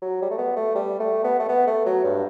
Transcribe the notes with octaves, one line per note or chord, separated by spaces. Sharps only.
F#3
G3
A3
B3
A3
G3
A3
B3
A3
B3
A3
F#3
G2